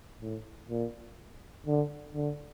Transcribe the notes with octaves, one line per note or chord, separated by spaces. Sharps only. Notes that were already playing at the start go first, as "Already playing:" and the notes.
A2
A#2
D3
D3